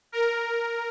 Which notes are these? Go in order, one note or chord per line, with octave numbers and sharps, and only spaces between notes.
A#4